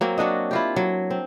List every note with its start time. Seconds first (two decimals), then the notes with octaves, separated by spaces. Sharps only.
0.01 F#3 A#3 C4
0.18 F#3 D4 F#4 D#5
0.51 E4 F4 G4
0.76 F#3
1.10 C4